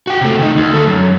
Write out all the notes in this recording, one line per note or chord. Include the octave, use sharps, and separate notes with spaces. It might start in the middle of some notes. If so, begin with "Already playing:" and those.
F#4 G5
C3 A3
D2 D#4
D2
G#3 A4
F#2